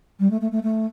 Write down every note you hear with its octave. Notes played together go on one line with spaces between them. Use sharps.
G3
A3
A3
A3
A3